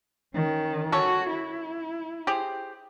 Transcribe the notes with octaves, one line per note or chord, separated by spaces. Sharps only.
D#3 C#4
C#4 F#4 A4 C#5
E4
G4 G#4 C5